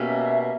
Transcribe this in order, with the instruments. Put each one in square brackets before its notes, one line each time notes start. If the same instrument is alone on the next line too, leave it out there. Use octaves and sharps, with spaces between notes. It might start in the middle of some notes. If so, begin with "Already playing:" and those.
Already playing: [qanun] B2 A#3 C#4 G4 [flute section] E5